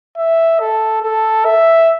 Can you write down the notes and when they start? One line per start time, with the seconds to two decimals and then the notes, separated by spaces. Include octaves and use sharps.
0.17 E5
0.60 A4
1.02 A4
1.45 E5